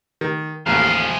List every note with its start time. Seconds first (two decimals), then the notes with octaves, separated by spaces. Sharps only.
0.21 D#3
0.66 A1 D#2 F3 G#4 F5